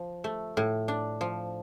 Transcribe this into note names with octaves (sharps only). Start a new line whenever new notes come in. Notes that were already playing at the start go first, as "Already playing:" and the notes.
Already playing: F3
A3
A2
D4
F3